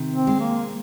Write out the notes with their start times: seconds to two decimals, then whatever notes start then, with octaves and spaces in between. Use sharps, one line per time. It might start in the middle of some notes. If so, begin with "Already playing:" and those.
Already playing: C3 D#3
0.12 C4
0.27 G#3
0.40 A#3